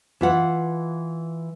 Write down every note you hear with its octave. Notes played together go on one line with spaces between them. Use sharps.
E3 F4 F#5